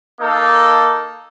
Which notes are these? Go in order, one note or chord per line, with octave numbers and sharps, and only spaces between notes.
A#3 D#4 A4